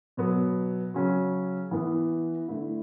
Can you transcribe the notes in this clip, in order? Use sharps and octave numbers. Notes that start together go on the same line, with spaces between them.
B2 F#3 B3
C#3 F#3 C#4
E3 B3 E4
D3 A3 E4